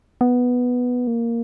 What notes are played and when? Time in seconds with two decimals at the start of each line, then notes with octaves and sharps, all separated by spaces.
0.21 B3
1.07 A#3